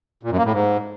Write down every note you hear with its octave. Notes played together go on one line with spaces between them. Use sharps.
A#2
F#2
A#3
A2
G#2